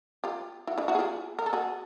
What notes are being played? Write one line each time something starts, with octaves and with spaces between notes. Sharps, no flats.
F4 G4
E4 F#4
D4 E4
E4 F#4
G#4
F4 G4
A#4
A4
F#4 G#4